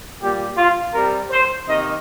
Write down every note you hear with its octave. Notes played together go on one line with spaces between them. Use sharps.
A#2 G3 A#3 G4
F4
C3 G3 C4 A#4
C5
C3 D#3 A#3 D#5